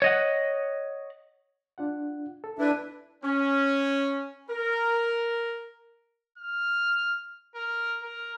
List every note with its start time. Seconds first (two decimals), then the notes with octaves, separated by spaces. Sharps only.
0.02 C#5 D#5 F#5
1.78 D4 F4 F#5
2.44 A4
2.59 D4 E4 B4
3.23 C#4
4.50 A#4
6.38 F6
7.55 A#4
8.03 A#4